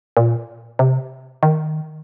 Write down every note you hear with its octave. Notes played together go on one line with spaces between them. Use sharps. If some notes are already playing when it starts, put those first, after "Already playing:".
A#2
C3
D#3